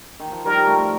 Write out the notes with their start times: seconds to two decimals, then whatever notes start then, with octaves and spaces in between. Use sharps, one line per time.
0.20 D#3
0.32 F3
0.45 D#3 G3 A#4
0.67 F3 A3